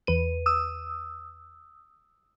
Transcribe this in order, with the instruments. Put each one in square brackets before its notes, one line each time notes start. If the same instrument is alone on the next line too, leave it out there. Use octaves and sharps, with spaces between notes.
[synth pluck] E2 B4 D#7
[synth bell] D#6 E6